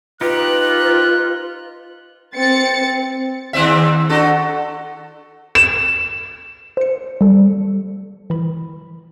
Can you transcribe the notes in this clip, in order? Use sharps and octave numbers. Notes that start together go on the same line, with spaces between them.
D#4 F4 G4 B4 F#6
C4 A6 C#7
D#2 C4 E5
D4 F#4 A4
E7
C5 C#7
G3 A4
E3 B5